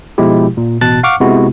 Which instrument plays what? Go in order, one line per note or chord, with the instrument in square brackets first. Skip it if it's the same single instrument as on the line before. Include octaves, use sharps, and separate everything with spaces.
[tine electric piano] B2 F3 G#3 E4 G4
A#2
A1 B2 A5 F#6 A6
F5 F#5 C#6 D6 F6
C3 G#3 B3 E4 F#4